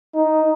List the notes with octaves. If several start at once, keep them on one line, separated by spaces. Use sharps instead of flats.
D#4